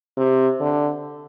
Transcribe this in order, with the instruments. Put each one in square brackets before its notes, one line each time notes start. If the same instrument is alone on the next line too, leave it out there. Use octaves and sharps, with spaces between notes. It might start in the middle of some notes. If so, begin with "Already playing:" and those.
[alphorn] C3
D3